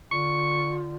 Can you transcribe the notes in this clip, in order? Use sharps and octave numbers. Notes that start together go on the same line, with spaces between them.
D3 F4 C#6